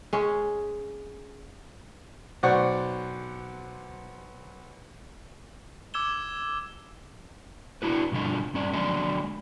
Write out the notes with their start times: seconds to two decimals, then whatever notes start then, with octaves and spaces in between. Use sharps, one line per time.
0.13 G#3 C#4
2.43 B1 C5 D5 F#5 C#6
5.94 D6 E6 G#6 E7 G7
7.82 D4 E4 F#4 B4
8.12 G2 B2 D3 F4 D#5
8.54 G2 C#4 D5
8.73 D3 F#3 G#3 D5 D#5